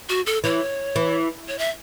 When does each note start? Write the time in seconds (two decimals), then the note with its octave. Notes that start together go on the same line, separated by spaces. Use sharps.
0.09 F#4
0.26 A4
0.44 E3 C#5
0.96 E3
1.48 C#5
1.59 E5